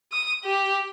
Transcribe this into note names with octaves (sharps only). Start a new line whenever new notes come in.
D#6
G4